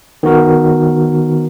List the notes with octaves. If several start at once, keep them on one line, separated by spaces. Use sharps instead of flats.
D#3 B3 F#4 A#4